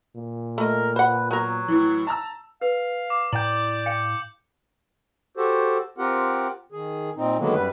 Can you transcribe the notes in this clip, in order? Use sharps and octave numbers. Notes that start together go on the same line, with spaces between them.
A#2
A3 A#4 D#5
B4 C5 F#5
F#3 B3 A#4
A2 E3
A5 A#5 E6
B4 F5
D6
A2 D5 G5 A#5 G6 F#7
F5 G5 C#7
F#4 G4 A4 C5
C4 F4 G4 A#4 F#5
D#3 G#4
A#2 C4 D#4
D3 D#3 F#3 G#3 A#3 B3
F#2 G3 B4